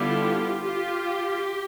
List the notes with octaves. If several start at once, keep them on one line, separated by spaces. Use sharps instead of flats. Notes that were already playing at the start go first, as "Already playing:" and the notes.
Already playing: D3 G3 B3 E4 F4 G4
F4 G4